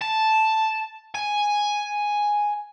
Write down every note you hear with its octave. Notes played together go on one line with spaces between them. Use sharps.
A5
G#5